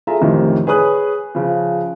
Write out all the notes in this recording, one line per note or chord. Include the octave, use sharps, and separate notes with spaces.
F4 G#4 A4 E5 A#5
A1 F2 C3 D#3
G#4 B4 C#5 D#6 F#6
C#3 F3